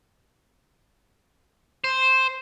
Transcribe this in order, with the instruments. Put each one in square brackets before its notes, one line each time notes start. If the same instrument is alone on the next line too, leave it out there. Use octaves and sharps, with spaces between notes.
[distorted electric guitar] C5